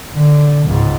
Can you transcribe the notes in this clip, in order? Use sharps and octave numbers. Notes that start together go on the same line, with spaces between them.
D3
C#2 G#2